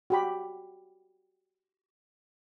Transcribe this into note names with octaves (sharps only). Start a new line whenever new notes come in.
F#4 G4 B5